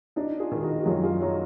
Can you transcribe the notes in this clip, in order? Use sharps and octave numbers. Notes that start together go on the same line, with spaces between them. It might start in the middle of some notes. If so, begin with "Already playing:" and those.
D4 D#4 F#4
F4 G#4
D#3
D#4 F#4
F#4
F#2 F4 G#4
F4 G#4
F#3 D#4 F#4